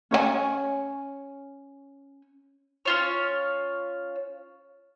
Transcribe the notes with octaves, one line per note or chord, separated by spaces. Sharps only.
C#4 C#5 D5 G#5
C#4 F4 C#5